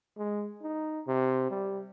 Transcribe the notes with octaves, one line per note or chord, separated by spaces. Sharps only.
G#3
D#4
C3
G3